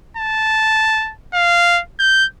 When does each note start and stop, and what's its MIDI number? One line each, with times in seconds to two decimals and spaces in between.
0.17 1.12 81
1.33 1.80 77
1.99 2.25 91